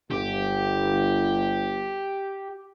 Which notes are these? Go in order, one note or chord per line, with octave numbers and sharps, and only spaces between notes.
G1 G4